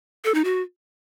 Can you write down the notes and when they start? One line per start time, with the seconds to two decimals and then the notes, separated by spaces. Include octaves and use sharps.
0.24 A4
0.34 D#4
0.44 F#4